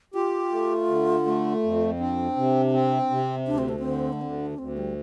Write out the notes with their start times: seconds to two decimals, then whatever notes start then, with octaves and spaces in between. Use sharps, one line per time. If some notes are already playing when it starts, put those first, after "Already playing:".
0.14 F4 G4
0.52 A3
0.89 D3
1.26 A3
1.63 F2
1.99 C4 D4
2.36 C3
2.73 C4
3.10 C3
3.47 D2 D4
3.58 C4
3.69 A3
3.79 C4
3.85 D3
4.13 A3
4.21 D2 C4
4.40 D4
4.58 D2 C4
4.77 G3